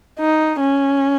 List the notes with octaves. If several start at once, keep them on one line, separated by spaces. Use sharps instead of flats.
D#4
C#4